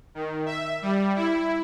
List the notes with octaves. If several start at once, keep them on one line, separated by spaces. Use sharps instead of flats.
D#3
E5
G3
E4